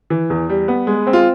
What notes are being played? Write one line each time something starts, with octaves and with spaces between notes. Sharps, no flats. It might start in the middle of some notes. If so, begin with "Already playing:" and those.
E3
E2
G3
B3
G#3
C4
F4